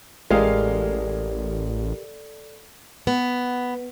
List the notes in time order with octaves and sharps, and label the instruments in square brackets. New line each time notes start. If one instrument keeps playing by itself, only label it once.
[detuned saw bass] A1 [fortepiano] G#3 F5 [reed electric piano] G4 A#4 [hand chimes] A4 D5
[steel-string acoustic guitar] B3